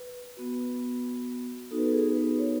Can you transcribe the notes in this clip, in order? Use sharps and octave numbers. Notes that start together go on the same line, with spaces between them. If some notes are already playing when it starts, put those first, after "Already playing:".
Already playing: B4
B3 F#4
B3 D#4 F#4 A4
B4
A4
G#4
B4
C#5